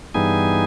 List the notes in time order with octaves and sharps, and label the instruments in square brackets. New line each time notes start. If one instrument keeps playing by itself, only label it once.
[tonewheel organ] G2 E3 G3 B3 D#4 G#4 G#5